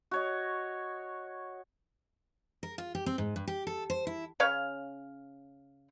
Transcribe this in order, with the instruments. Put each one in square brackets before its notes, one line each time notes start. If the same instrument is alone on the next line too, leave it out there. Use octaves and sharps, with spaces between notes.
[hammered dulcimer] F#4 C#5 D#5
[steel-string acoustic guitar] A#4
F4
G4
C4
G#2
G2
G4
A4
C5
E4
[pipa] C#3 C#4 C#5 F5